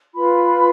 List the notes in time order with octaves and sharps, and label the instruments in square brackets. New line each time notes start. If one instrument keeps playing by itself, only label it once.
[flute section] F4 B4 B5